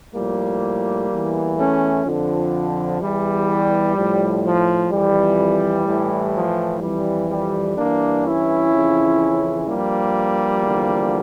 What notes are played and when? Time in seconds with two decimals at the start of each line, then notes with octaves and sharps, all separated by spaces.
0.14 A2 F3 G3 A#3
1.10 E2 E3
1.58 A3 C#4
2.05 F2 D3 F3
3.00 E2 E3 G3
3.96 A2 F3
4.43 F3
4.90 F2 E3 G3
5.86 A2 E3
6.34 F3
6.80 F2 E3 G3
7.28 G3
7.76 G2 E3 A#3 D4
8.23 C#4 E4
8.71 F2 C#3 E3
9.66 G2 F3 G3 A#3
10.61 E2 D3 F3